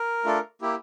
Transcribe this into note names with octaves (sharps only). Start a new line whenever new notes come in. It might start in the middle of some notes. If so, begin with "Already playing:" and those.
Already playing: A#4
A3 D4 F4 A4
A#3 E4 G4